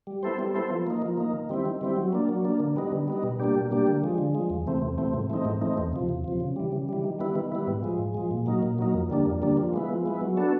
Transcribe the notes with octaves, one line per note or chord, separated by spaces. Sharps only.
G3
B3 E4 A4 C5
G3
B3 E4 A4 C5
F3
A#3 D#4
F3
A#3 D#4
D#3
G3 C4 E4
D#3
G3 C4 E4
F#3
A#3 D4
F#3
A#3 D4
D3
G3 B3 D#4
D3
G3 B3 D#4
B2
G3 A#3 D4 G4
B2
G3 A#3 D4 G4
D3
F3 G#3
D3
F3 G#3
E2
C3 E3 A3 C4
E2
C3 E3 A3 C4
G#2
E3 A3 C4 D#4
G#2
E3 A3 C4 D#4
E2
C3 F3
E2
C3 F3
C#3
E3 G3
C#3
E3 G3
D#3
G3 B3 E4
D#3
G3 B3 E4
G#2
F3 G#3
G#2
F3 G#3
A#2
F#3 A#3 D#4
A#2
F#3 A#3 D#4
F2
D3 G3 A#3 D4
F2
D3 G3 A#3 D4
F3
G#3 B3 E4
F3
G#3 B3 E4
F#3
B3 D4 F#4 A4